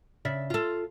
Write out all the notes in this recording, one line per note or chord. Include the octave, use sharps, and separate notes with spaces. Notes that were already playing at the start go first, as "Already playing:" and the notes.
C#3 D5 E5
F4 A4